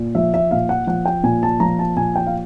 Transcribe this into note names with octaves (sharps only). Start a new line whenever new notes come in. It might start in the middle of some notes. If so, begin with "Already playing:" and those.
Already playing: A#2
F3 E5
E5
A#2 F5
F#5
F3 F#5
G5
A#2 G#5
A5
F3 A#5
A5
A#2 G#5
G5
F5